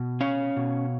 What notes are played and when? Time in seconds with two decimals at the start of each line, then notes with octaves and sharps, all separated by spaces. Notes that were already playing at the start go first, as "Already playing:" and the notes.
Already playing: B2
0.21 C#4 C#5 F5
0.56 B2